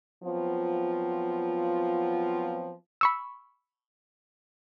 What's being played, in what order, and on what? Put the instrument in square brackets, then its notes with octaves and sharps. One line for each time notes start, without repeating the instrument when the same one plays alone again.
[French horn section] F3 F#3 B3 C4 F4
[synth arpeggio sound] B5 C#6 E6